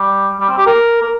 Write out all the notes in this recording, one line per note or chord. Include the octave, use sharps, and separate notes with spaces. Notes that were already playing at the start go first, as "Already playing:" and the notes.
Already playing: G3
G3
C4
G4
A#4
A#4